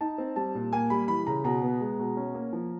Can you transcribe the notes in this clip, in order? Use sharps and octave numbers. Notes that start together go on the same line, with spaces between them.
D#4 A5
C4
G3 A5
A#2
A#3 G#5
G3 B5
E3 B5
C#3 A#5
B2 A#5
B3
G#3
B2
C#4
A#3
F3